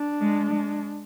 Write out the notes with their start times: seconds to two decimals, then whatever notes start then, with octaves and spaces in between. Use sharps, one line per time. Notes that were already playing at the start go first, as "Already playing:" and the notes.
Already playing: D4
0.21 G#3
0.51 G#3